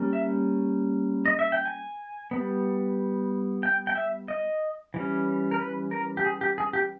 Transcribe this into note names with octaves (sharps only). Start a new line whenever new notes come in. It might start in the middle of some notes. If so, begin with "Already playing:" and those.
Already playing: G3 A#3 C#4
E5
D#5
E5
G5
G#5
G3 B3
G5
G5
E5
D#5
E3 G3 C#4
A#4
B4
A#4
G4
G#4
G4
G#4
G4